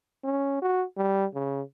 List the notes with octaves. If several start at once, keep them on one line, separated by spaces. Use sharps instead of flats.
C#4
F#4
G3
C#3